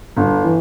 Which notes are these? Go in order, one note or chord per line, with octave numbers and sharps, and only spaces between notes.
G1
E3